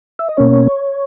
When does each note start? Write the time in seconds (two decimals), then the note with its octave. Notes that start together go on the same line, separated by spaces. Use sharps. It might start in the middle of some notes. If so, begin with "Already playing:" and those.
0.19 E5
0.29 D#5
0.37 B2 A#3 C#4 C#5